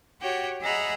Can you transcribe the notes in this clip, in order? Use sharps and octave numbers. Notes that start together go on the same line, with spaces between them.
F#4 G4 C#5 F#5 G5
G#4 D#5 E5 F#5 A#5 B5